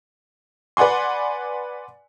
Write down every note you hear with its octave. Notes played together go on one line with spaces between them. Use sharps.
B4 D5 F#5 G#5 C6